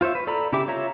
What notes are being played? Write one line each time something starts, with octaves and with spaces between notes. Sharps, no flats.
F4 C5 C#5 E5
B4
A4 D5 A#5 B5
C#3 E4 G4 E5 D6
F4 C#5 E5 A#5